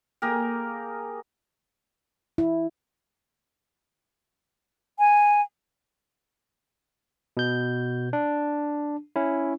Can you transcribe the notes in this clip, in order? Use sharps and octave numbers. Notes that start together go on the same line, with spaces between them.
A#3 G4 G#4 A#4
E4
G#5
B2 G6
D4
C#4 E4